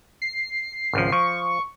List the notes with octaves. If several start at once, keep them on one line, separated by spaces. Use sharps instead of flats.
C7
G#1 C#2 F3
F3 C#6